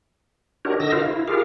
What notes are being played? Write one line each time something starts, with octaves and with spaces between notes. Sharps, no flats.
D4 D#4 F#4 G4 A#4 C#5
D3 D#5 E6 A#6
F4 F#4 A#4 C5 F5
E4
F4 G4 G#4 A#4 F5